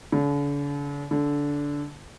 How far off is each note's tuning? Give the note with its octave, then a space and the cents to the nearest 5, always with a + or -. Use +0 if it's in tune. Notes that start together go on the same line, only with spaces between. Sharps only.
D3 -45
D3 -20